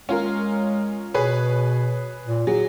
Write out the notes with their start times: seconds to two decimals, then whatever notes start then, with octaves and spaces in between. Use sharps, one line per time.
0.09 G#3 C#4 F4 A#4
1.14 B2 G#4 B4 C#5
2.26 A#2
2.47 F#3 G#4